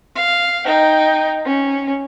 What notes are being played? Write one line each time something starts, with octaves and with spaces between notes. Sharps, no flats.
F5
D#4 G5
C#4